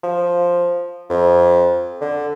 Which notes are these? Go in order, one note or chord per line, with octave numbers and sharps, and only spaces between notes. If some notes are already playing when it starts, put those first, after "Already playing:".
F3
F2
D3